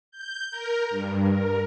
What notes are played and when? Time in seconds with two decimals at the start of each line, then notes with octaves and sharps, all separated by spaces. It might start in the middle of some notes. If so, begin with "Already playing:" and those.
0.11 G6
0.51 A#4
0.90 G2
1.30 A#4